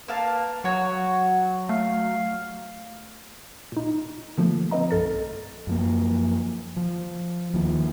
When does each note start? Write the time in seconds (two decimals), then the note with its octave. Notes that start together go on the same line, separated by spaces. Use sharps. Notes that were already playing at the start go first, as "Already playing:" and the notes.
0.08 A#3 B4 F5 A5
0.64 F#3 F#4 C#5 F#5
1.69 A3 F5
3.72 A#2 D#4
4.37 D3 F3 A3 A#3
4.71 C4 B4 D#5 A#5
4.91 B1 G2 A4 F6 A6
5.67 F#2 F3 A#3
6.77 F3
7.53 D#2 D#3 F3 A#3